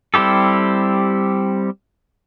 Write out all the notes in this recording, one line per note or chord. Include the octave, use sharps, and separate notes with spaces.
G3 C4 E4 G4 A4